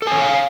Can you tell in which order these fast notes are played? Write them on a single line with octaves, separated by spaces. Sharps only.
A4 G#5 C#5 F#5 F5